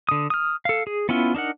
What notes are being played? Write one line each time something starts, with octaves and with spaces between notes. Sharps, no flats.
D3 D#6
D#6 F6
A4 F5
G#4
B3 C#4 E4 F4
D4 D#4 A#4 F#5